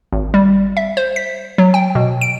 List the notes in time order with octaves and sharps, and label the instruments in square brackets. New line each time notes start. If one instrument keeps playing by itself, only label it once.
[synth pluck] G#1
G3
E5
C5
B6
F#3
G5
B2
D7